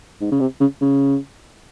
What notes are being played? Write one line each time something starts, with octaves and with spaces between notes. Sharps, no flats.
G#2
C#3
C3
C#3
C#3